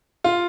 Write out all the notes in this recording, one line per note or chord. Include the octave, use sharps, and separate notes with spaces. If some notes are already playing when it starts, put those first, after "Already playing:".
F4